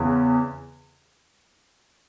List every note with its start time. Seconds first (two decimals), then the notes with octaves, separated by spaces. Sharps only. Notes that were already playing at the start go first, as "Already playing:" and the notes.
Already playing: E2 C#3 E3